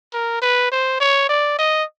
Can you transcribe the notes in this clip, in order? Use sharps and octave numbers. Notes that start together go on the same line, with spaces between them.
A#4
B4
C5
C#5
D5
D#5